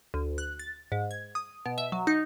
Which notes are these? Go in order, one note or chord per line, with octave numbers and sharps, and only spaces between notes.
D2
F#6
A6
G#2
G#6
D#6
B2
E5
F#3
D#4